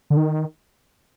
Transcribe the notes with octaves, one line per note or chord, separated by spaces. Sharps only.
D3
D#3